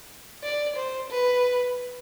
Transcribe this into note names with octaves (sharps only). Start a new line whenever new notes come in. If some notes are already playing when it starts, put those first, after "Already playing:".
D5
C5
B4